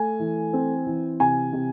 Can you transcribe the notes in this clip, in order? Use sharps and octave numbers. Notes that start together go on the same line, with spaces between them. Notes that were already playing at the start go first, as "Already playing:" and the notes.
Already playing: A3 G#5
E3
C4
E3
C3 G#5
C3